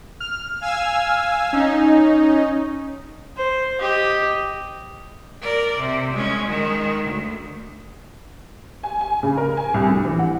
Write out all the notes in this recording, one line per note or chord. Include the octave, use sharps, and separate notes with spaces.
F6
F5 G#5 E6
C#4 D#4
C5
G4 D#5
A#4 D5
C3
G#3 C#4
D#3 G#3
D2
G#5
G#5
C#3
A#4
G#5
C2
D2
E3
F#5